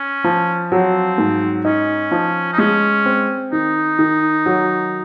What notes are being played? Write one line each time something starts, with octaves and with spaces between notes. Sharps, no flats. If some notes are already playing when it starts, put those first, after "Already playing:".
Already playing: C#4
F3
F#3 C4
G#2
C#4 D#4
F3
D#4
G#3 C#4
C4
D#3 D#4
D#3
F#3